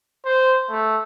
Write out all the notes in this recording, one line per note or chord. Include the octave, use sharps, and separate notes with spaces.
C5
A3